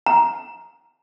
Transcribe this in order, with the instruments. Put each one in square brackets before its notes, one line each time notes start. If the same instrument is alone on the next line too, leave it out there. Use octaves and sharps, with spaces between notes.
[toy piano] A#5